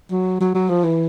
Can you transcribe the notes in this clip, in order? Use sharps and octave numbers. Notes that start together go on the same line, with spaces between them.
F#3
F#3
F#3
F3
E3